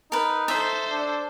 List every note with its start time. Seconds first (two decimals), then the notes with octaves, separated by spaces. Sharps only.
0.12 D#4 A#4 B4
0.48 A4 C5 E5
0.90 D4